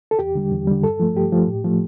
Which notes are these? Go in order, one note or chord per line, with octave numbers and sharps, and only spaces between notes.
A4
E2 G4
D3 G3
E2
D3 G3
G2 A4
F3 A3
G2 G4
F3 A3
A2
F3 A3